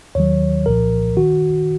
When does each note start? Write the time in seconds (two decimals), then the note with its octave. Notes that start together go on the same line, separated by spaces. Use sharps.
0.15 D#2 D#3 F#3 C#5
0.66 C2 A#2 F3 A#4
1.17 D#3 F#4